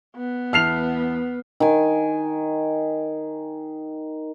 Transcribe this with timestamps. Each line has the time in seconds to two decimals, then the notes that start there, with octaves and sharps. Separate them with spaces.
0.16 B3
0.53 E2 E4 A5 F6 C7 F7
1.60 D#3 G#5